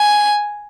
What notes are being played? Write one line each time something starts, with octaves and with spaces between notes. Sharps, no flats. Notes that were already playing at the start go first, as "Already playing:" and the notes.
Already playing: G#5